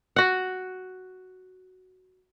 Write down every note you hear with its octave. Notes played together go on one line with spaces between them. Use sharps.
F#4 F#5